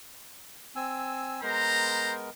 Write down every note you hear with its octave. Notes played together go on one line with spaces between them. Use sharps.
C4 G#5 E6
G#3 B3 A#4 C5 A#5